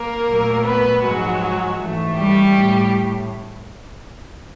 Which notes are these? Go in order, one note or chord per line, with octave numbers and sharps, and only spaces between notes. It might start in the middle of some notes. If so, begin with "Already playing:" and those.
Already playing: A#3 A#4
A#2 F#3 A3
B3 B4
G#2 F3 F#3 G#3 F#4
G#2 E3 A3
G3 G4
A2